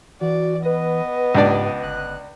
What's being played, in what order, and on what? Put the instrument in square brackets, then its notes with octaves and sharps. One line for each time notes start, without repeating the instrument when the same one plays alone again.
[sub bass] E3 [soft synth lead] F#4 [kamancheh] D5
[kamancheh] B3 D#5 [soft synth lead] B4
[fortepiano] C#2 D4 D5 [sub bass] G#2 [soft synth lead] G4
[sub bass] G1 [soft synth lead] F#6